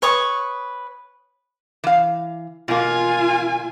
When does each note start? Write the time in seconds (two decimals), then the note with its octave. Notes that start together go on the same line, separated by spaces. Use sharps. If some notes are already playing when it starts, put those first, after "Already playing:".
0.02 B4 C#5 C#6 D#6
1.84 E3 F5
2.68 B2 A#3 F4 G#5